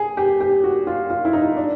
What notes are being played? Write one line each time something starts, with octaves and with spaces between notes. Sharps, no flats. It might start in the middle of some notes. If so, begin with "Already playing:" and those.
Already playing: G#4
G4
G4
F#4
F4
F4
E4
D#4
D4